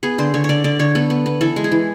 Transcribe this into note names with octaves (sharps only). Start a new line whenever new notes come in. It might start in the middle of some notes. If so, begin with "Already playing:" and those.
B3 G#4
D3 C5
D3 C#5
C#5
D3 D5
D3 D5
D3 C#5
B3 A4
B3
B3
E3 A4
G#3
G#4
E3